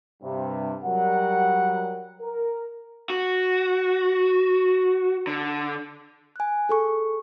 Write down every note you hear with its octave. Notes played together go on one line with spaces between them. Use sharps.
G2 C3
F#3 G3 A#4 F#5
A#4
F#4
D3
G#5 F#6
G#4 A4 C#6